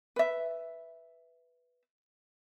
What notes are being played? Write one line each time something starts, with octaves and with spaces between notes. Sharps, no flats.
B4 E5